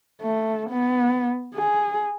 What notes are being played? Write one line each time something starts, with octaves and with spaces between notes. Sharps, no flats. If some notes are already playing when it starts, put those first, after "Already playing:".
A3
B3
G#4